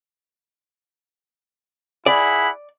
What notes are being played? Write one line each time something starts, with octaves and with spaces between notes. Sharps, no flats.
E4 G#4 D5 F#5 B5